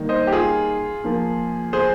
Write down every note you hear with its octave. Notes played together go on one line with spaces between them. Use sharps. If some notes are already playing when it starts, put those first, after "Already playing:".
Already playing: D#3 G3 A#3 D#4
C5 D#5
G4
F4 G#4
F3 A#3 F4
G#4 C5